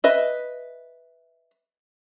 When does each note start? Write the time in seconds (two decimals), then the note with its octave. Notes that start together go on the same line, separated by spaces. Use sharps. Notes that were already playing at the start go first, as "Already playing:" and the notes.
0.04 B4 D#5 E5